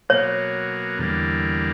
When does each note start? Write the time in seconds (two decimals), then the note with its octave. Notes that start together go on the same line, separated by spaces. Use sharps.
0.09 B2 F#3 A#3 C#5
0.99 E2 D3 G3 A#3